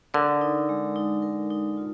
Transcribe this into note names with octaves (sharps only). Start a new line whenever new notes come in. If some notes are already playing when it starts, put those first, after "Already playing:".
D3 A#4
D#4
G#3
D#4
A#4
D#4
F4